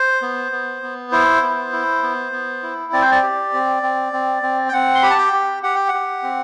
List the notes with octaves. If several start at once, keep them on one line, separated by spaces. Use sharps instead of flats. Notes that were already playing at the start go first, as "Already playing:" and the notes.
Already playing: C5
B3
B3
B3
E4 C5
B3
E4
B3
B3
E4
C4 D5
C5
D5
G4
C4
C4
C4
C4
G5
C4 F#5
C6
G4 B5
A5
G5
G4
G4 F#5
G5
F#5
G4
C4